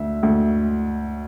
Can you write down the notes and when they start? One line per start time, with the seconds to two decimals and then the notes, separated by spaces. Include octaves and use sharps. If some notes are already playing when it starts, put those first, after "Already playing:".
Already playing: D2 E5
0.23 D2